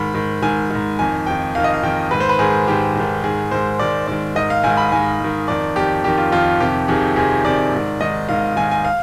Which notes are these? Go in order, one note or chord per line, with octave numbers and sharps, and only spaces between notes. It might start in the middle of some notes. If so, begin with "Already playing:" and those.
Already playing: G#2 D#3 B5
G#2 D#3
G#2 D#3 G#5
G#2 D#3
F2 D#3 G#5
F2 D#3 G5
F2 D#3 F5
D#5
F5
F2 D#3 G5
G#2 D#3 B4
C5
B4
G#2 D#3 G#4
G#2 D#3 G4
G#2 D#3
G#2 D#3 G#4
G#2 D#3 C5
G#2 D#3 D5
G#2 D#3 D5
G#2 D#3 D#5
F5
G#2 D#3 G#5
B5
G#2 D#3 G#5
G#2 D#3
F2 D#3 D5
F2 D#3 G4
F2 D#3 G4
F4
F2 D#3 F4
F2 C3 D#3 G4
F2 C3 D#3 G#4
F2 C3 D#3 G#4
F2 C3 D#3 D5
G#2 D#3
G#2 D#3 D#5
G#2 D#3 F5
G#2 D#3 G#5
G#5
F5